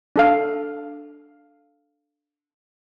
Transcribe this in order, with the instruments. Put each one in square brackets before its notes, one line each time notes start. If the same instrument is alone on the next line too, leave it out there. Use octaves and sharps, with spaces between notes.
[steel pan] D4 A4 F5